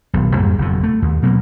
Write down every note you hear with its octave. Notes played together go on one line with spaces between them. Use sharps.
D#1 B1
F2 G#2 G3 A#3
F#1 F2 B2
A3
D#2
B2 F#3 G#3 A#3